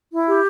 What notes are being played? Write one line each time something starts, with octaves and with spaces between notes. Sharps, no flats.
E4
G4